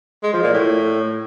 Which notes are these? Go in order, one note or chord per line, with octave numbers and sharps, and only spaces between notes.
G#3
F3
A#2
A2